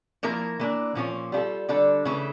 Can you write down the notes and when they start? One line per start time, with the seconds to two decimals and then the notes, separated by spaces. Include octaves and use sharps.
0.23 F3 A#3 E4 A#4
0.60 E3 A#3 D4
0.95 A#2 F3 A#3 C#4 F4
1.32 G3 D4 F4 A4
1.69 D3 G3 D4 A4
2.05 C#3 E3 A3 E4